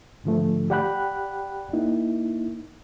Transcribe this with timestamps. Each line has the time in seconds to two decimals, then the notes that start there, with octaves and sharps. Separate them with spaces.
0.24 G#2 D3 F3 A3
0.70 G4 D5 F#5 G5 B5 F#6
1.73 A#3 D#4 E4